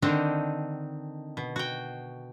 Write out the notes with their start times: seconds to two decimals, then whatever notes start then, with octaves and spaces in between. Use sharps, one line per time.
0.02 D3 D#3 C4 D4 D#4
1.37 B2
1.56 F#4 G5